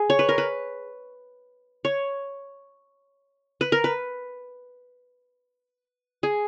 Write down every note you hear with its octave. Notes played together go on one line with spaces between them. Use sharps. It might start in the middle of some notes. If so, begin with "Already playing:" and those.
Already playing: G#4
C#5
B4
A#4
B4
C#5
B4
A#4
B4
G#4